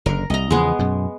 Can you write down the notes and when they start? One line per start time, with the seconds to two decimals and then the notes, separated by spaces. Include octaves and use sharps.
0.06 F#1 D3 A#4
0.30 C2 D#5 A#5
0.51 E2 C#3 F3 G#3 B3
0.79 F#2 B2